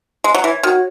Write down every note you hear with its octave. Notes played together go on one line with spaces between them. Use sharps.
G#3
F#3
E3 C#5
D#3 F#4